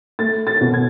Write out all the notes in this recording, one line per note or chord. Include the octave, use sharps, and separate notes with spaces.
A3 A6
A6
B2
G#6